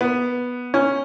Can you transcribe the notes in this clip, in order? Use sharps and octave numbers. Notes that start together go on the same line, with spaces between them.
B3
C#4